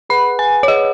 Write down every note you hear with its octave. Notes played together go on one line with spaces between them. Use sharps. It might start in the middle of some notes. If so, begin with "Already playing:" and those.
G#4 B4 F#5 B5
G#5
C#5
G#4 B4 D#5 F#5